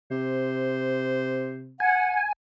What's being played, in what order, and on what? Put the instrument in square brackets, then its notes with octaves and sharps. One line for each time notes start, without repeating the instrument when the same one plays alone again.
[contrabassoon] C3 [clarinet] C5
[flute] F#5 [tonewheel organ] G#5